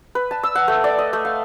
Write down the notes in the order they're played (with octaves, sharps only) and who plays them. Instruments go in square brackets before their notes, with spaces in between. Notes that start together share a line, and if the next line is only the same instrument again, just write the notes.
[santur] B4
A5
E6
F#5
A3
D5
D#5
A3
F5